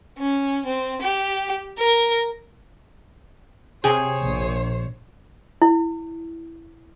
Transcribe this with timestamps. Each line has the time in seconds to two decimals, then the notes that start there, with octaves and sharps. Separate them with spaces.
0.19 C#4
0.66 C4
1.02 G4
1.79 A#4
3.84 C3 G#4 C5 C#5 G5
4.21 A#1
5.62 E4